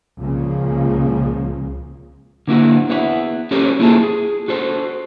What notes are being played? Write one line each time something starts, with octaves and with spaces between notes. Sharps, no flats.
C#2 A#2 C#3 F3 A#3
D3 A#3 E4 F#4
B3 E4 F#4 C#5 E5 F#5
C#4 G4 A4 A#4 C5 C#5
A#3 E4 F4 G#4 A4 A5
G#4
F#4 A4 C5